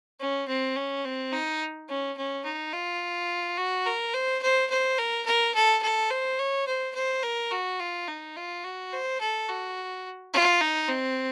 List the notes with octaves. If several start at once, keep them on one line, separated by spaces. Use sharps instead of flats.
C#4
C4
C#4
C4
D#4
C#4
C#4
D#4
F4
F#4
A#4
C5
C5
C5
A#4
A#4
A4
A4
C5
C#5
C5
C5
A#4
F#4
F4
D#4
F4
F#4
C5
A4
F#4
F4
D#4
C4